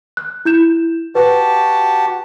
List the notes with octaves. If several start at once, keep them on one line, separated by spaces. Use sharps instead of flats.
F#6
E4 G6 E7
F#4 G4 B4 A5